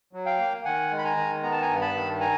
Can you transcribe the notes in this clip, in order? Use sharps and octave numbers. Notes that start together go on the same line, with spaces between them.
F#3
F5 G5
A#3
D#3 F#5 G#5
G#3
B5
G#5 A#5
D#3
B3 A#5
A5
G#5 A#5
G2
A5 B5
D#3
G#5 A#5